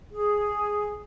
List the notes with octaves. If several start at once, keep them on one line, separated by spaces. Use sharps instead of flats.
G#4